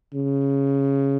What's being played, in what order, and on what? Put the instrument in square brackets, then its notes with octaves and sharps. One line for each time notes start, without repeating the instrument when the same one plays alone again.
[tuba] C#3